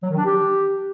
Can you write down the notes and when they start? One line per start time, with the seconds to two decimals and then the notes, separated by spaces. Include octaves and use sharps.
0.03 F#3
0.10 D#3
0.18 D4
0.25 G4